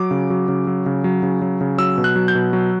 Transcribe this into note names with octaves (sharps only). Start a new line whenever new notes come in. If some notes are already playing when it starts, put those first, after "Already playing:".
Already playing: F#3 D6
C#3
F#3
C#3
F#3
C#3
F#3
C#3
F#3
C#3
F#3 E6
B2
F#6
F#3
G6
B2
F#3